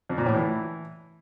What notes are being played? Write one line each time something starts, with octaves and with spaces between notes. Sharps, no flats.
F2
A#2
A2
E3